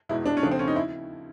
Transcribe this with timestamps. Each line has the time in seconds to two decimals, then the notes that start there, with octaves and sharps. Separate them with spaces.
0.09 E2 B2 G#3 E4
0.26 D4
0.37 C#4
0.42 D#2 C#3 F3 A3 D4
0.51 C4
0.59 C#4
0.68 D#4
0.76 E4